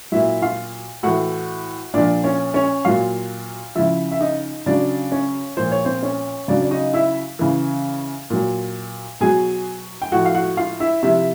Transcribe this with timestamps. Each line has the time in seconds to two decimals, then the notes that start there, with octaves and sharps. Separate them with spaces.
0.12 A#2 F#3 E4 E5
0.42 F4 F5
1.03 A2 E3 F#4 F#5
1.94 A#2 F3 D4 D5
2.24 C#4 C#5
2.54 C#4 C#5
2.85 A#2 F#3 F4 F5
3.75 C#3 F3 E4 E5
4.11 E5
4.21 D#4 D#5
4.66 C#3 F#3 D4 D5
5.11 C#4 C#5
5.57 A#2 F3 C5
5.71 C#5
5.85 C4 C5
6.03 C#4 C#5
6.48 C#3 F#3 D4 D5
6.62 D5
6.71 D#4 D#5
6.94 E4 E5
7.39 C#3 E3
8.30 A#2 F#3
9.21 B2 F#3 G#4 G#5
10.02 G5
10.12 A2 F3 F#4 F#5
10.25 F5
10.35 F#4 F#5
10.57 F4 F5
10.80 E4 E5
11.03 C3 F3 E4 E5